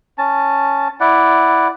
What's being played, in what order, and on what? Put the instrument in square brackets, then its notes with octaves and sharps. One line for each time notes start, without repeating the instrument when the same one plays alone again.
[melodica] C#4 A5
E4 D5 F#5